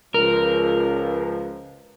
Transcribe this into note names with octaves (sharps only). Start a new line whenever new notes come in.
C#2 F3 A#4